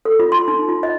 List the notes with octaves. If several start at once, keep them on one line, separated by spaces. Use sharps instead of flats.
A4
F4
C6
D#4
F4
D#5